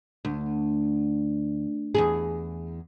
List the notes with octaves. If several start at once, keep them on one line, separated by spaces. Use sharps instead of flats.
D2
E2 G2 G#4